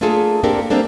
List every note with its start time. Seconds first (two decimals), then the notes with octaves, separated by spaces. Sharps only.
0.01 A3 A#3 D4 F4 G#4 A4
0.43 A#3 C4 D4 G4 A4 A#4
0.70 A3 A#3 C4 D4 A4